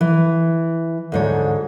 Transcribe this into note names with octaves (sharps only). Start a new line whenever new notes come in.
E3
D2 G#2 C#5